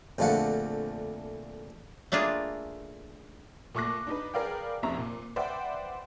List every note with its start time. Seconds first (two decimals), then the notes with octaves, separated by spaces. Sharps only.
0.18 A#1 F2 D3 A3 F5 F#5
2.12 A3 A#3 D4 F4 G#4
3.75 A#2 A3 C#6 D6 F#6 A#6
4.07 D4 D#4 B4
4.34 G#4 A#4 B4 D5 F5 G5
4.83 F1 F2 E5 A#5 C#6
4.97 A#2
5.36 B4 C5 D5 E5 F#5 G5